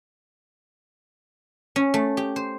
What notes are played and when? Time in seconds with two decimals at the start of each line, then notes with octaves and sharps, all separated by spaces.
1.76 C#4
1.94 A3
2.17 G4
2.36 C5